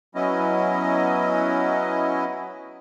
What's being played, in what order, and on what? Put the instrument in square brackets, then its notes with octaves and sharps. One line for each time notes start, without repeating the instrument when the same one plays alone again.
[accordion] F#3 B3 C#4 E4 D#5